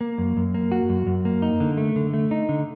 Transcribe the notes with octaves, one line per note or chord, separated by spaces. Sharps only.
A#3
F#2
F#2
A#3
F#4
F#2
F#2
A#3
D#4
D3
A3
D3
A3
D#4
D3